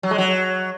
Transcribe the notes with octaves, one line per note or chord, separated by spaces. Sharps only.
F#3
G#3
F#3